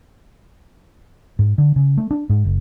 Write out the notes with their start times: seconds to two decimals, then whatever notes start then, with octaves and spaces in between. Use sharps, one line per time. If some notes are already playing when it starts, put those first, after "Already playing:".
1.39 G#2
1.58 D3
1.76 C#3
1.97 A3
2.11 D4
2.29 G#2
2.45 F#1